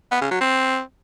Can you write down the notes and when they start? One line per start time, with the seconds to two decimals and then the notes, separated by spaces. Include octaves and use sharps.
0.11 B3
0.21 C#3
0.31 F#3
0.41 C4